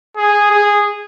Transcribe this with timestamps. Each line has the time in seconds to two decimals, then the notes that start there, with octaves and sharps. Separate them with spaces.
0.16 G#4
0.51 G#4